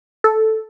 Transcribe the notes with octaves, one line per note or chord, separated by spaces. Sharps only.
A4